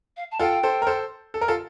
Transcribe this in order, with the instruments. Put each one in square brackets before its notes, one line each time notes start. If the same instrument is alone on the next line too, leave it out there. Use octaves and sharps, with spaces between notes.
[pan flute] F5
A5
[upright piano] F4 A4 [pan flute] G5
[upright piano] A4 C5
A#4
A4 C5
A4
A#4
F4 A4